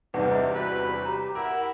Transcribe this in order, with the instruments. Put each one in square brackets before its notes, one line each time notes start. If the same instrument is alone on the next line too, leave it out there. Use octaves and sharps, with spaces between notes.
[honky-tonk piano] E2 G2 C3 [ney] D#4 [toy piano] B4 F#5 A5
[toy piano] E4 F4 D#5 [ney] E5
[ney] F#4 [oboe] B4
[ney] G4 [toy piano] C#5 A#5
[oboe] E4 [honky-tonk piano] A#4 [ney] F#5